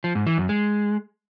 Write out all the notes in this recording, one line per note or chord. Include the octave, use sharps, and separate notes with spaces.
F3
G#2
E3
F#2
G#3